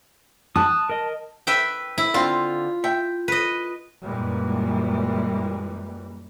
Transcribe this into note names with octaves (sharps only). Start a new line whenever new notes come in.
A5 D#6 F#6
A#4 D#5
B4 E5 G5
E4
D3 C4 F4
E5 G5
B4 D#5
F#2 A#2 E3 G3 G#3